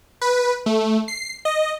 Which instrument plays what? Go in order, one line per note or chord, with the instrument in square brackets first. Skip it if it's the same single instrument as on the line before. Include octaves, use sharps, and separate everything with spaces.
[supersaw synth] B4
A3
C7
D#5